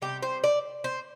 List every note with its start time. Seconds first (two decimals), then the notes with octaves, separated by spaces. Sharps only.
0.02 C3 G3 G4
0.23 C5
0.44 D5
0.84 C5